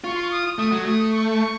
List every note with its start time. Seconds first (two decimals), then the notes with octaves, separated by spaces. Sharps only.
0.04 F4 C#6
0.15 C6
0.23 C#6
0.31 D#6
0.58 A3 D#6
0.72 F#3
0.86 A3 D#6
1.12 C#6